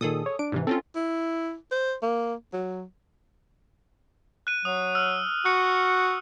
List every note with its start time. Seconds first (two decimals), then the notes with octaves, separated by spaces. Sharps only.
0.01 A#2 D#3 G#4 A4 D#6
0.26 C#5
0.39 D4 D7
0.52 G#2 C3 E3
0.67 C4 C#4 F4 A4
0.95 E4
1.72 C5
2.02 A#3
2.53 F#3
4.47 F#6 D#7
4.65 F#3 D#6
4.95 E6 F6
5.45 F#4 F#6 C#7